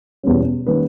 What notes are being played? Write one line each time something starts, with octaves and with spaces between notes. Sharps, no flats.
E2 B2 G3 C#4
D#3 G3 A#3 C#4 B4